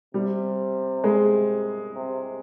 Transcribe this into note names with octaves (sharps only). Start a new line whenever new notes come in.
C3 G3
G#3
C3